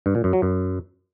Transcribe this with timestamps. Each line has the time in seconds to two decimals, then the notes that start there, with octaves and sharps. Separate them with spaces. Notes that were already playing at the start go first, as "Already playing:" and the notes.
0.06 G2
0.15 A#2
0.24 F#2
0.33 F#3
0.42 F#2